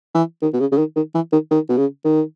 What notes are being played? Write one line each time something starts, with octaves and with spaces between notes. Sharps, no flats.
E3
D#3
B2
C#3
C#3
D#3
D#3
E3
D#3
D#3
B2
C#3
D#3